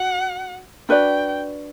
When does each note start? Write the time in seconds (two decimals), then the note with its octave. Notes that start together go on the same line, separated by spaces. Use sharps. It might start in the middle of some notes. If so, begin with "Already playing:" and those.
Already playing: F#4 F#5
0.89 D4 F#4 B4 D5 G5